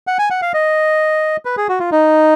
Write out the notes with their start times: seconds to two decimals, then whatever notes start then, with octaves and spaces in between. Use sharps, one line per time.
0.07 F#5
0.19 G#5
0.30 F#5
0.42 F5
0.54 D#5
1.45 B4
1.57 G#4
1.69 F#4
1.80 F4
1.92 D#4